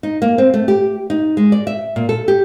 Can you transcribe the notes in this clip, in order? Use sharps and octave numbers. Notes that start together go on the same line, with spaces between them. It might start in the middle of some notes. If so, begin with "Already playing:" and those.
D#4
A#3
C4
A3
G4
D#4
G#3
D5
E5
A#2
A4
G4